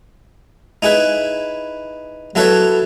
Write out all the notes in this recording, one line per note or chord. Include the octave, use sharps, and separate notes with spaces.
D#4 E4 G#4 B4
F#3 E4 A4 B4 C#5